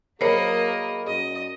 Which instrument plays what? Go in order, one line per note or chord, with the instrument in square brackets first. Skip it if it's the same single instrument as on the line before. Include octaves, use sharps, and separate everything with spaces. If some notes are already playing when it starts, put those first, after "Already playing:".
[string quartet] F#3 A#3 D#5 [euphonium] G#4 [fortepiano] A#4 B5 [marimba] C5 C#5
[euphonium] F#2 [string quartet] D#5